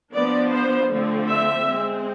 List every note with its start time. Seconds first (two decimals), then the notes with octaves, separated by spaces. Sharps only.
0.12 F3 B3 D4 D5
0.51 C5
0.90 D3 F3 A3 C4
1.28 E5
1.66 G#3 C4